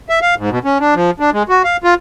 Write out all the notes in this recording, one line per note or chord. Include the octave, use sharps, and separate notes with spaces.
E5
F5
G#2
B2
C#4
D4
F3
D4
G#3
F#4
F5
F4